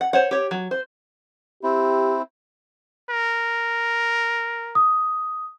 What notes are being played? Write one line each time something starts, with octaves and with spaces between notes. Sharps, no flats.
F#5
C5 C#5 F#5
G4 C#5
F#3
C5
C4 E4 G4
A#4
D#6